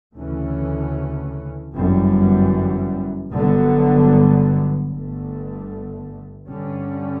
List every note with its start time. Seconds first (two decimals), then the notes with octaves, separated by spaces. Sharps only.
0.17 D2 C#3 E3 A3 C#4
1.75 G1 F#2 E3 G3
3.32 G1 G2 D3 F#3 B3
4.90 G1 G2 D3 A3
6.48 G2 D3 G3 C#4